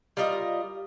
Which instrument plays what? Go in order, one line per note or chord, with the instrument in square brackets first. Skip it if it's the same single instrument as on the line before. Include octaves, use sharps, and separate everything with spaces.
[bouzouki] G3 F4 A#4 D#5